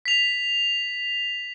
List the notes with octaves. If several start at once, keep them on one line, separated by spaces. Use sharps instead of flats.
B6 F7